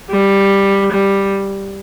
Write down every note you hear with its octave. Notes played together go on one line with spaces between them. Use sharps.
G3
G3